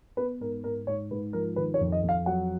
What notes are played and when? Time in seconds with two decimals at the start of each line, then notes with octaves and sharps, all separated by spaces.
0.17 B3 B4
0.40 G#2 A#4
0.63 G#2 A#4
0.87 G#2 C#5
1.11 G#2 B4
1.33 F3 A#4
1.56 D#3 B4
1.74 C#5
1.81 F2
1.92 D#5
2.03 F2
2.09 F5
2.26 F#3 F#5